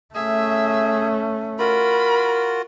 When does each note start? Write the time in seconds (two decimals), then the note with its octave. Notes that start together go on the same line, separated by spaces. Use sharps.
0.15 A3 C#4 G#4 E5
1.59 F4 F#4 A#4 B5